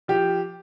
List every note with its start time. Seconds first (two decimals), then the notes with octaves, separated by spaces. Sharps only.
0.08 F3 G4